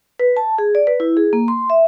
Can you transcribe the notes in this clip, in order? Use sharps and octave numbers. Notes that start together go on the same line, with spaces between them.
B4
A5
G#4
D5
B4
E4
G#4
A#3
C6
E5